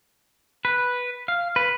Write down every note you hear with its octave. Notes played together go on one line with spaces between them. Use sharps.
B4
F5
B4